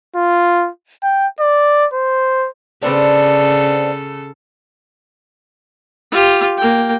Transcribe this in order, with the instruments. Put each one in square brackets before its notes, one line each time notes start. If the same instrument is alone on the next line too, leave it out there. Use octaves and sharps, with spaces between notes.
[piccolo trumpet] F4
G5
D5
C5
[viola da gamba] C#3 A4 [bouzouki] B3 C4 D4
[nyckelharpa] F4 G4
A#3 G5